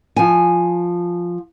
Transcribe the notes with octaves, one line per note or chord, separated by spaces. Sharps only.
F3 G#5